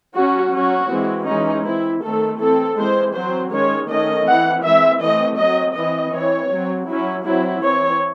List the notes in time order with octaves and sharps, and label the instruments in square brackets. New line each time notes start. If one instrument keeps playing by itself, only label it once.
[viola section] F#3 C#4 F#4
F#3 C#4 F#4
E3 G#3 C4
E3 G#3 C#4 D#4
E3 C4 E4
D#3 A3 C4 A4
E3 C4 A4
E3 G#3 C4 C5
F#3 C4 C5
D#3 G#3 C#4 C#5
D#3 A3 C#4 D#5
E3 C4 F#5
E3 G#3 C4 E5
E3 A3 C4 D#5
F#3 C4 D#5
E3 C4 D#5
E3 C4 C#5
F#3 C4
F#3 C#4 E4
F#3 C4 E4
E3 C4 C#5